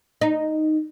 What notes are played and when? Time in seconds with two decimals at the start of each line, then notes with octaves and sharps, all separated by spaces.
0.21 D#4